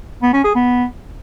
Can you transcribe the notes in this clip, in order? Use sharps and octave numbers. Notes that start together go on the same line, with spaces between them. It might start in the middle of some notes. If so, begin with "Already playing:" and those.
B3
C#4
G#4
B3